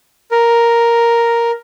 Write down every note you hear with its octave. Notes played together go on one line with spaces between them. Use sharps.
A#4